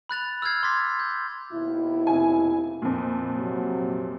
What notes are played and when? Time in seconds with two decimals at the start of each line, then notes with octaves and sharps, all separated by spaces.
0.09 B5 F#6 A6 F7
0.42 E6 F6 G6 G#6 C7
0.63 C6 D6 A6 B6
1.00 G6
1.52 D#2 B2 E4
2.07 F1 G#5
2.82 F2 A#2
3.34 C3 F#3